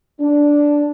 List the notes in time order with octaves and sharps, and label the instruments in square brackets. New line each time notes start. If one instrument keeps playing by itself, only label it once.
[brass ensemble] D4